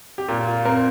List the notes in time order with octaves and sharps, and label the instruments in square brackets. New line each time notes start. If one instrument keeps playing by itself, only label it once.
[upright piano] G4
A#2 F4
F4
C4 A#4